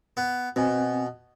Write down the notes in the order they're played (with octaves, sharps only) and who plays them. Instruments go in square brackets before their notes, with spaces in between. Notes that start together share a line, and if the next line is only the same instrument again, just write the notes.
[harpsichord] B3
[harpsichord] B2 [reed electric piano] C4 G#5